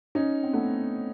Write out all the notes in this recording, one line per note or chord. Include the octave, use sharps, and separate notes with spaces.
C#4 D#4
C4
A3 B3